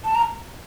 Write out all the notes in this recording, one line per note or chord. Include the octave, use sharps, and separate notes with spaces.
A5
A#5